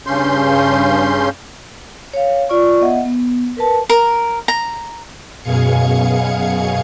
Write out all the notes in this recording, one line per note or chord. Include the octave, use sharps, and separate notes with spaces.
G2 C#3 C#4 C6 G6
C#5 F5
F4 D5 C#6
B3 D#5 E5 F#5
B3
A#4 B4 A5
A#4
A#5
F#2 B2 G#4 F5 G#6 C#7